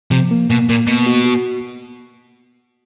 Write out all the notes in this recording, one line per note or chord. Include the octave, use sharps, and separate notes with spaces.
C3 F3
A#3
B2 A#3
A#2 A#3
B2 A#3
F#4
F#4